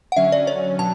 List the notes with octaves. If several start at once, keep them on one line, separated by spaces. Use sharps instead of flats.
F#5
D3 F#3 C#4 E5
D5
C#5
B2 F#3 A5